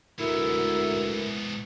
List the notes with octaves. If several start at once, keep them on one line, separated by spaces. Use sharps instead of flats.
D2 G#2 B3 E4 A#4